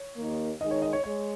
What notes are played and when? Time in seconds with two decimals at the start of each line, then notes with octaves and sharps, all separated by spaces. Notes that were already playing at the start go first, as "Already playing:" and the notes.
Already playing: C#5
0.17 D#2 D#3 A#3
0.60 D#3 G#3 D#4 D#5
0.71 C#5
0.82 D#5
0.93 C#5
1.04 G#3 C#5